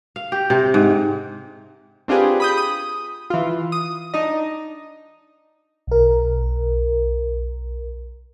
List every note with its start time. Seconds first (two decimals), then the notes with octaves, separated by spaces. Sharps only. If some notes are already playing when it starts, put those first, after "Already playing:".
0.16 F5
0.32 G4
0.50 C3
0.74 G#2
2.08 C4 D4 F4 G4 G#4 B4
2.40 B5 D#6 G6
2.57 D#6
3.30 E3 F4
3.72 D#6
4.14 D4 D#4 D#5
5.87 B1 A#4